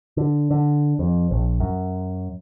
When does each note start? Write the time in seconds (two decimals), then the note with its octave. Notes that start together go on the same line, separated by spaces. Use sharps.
0.17 D3
0.51 D3
0.99 F2
1.31 A#1
1.60 F#2